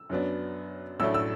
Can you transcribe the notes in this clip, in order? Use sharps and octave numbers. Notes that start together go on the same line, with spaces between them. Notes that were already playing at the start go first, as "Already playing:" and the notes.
Already playing: E6
F#2 F#3 B3 D4
A1 A2 F#3 A3 D4 E6
E6